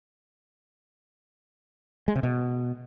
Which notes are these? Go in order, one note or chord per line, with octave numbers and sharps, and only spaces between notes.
G#3
C3
B2